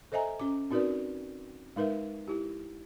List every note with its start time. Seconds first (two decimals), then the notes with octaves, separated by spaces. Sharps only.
0.12 A4 C5 D#5 E5 G#5 A#5
0.40 C#4 D6
0.71 C4 D#4 F#4 A#4 B4 D5
1.76 G#3 D#4 A#4 B4 E5
2.28 E4 G4